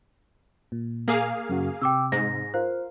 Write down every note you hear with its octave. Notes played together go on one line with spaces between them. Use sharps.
A#2
A#3 G#4 F5
F#2 C#3 F#4
C3 G5 D6 E6
G#2 A#6
F4 A#4 C5 F5